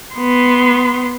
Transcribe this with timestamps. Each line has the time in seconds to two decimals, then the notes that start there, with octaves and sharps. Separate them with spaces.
0.15 B3 C6